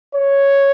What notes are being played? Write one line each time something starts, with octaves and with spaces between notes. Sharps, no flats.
C#5